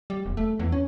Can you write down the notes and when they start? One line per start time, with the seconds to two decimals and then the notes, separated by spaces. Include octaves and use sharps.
0.10 G3
0.26 E1
0.37 A3
0.59 E2
0.72 C#4